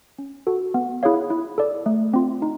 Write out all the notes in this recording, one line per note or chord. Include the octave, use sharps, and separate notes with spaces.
C#4
F#4 A4
B3
E4 G#4 C#5 F5
E4
A4 D5
A3
C4 F4
D#4